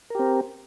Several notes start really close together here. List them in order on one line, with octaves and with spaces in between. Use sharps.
A#4 G4 C4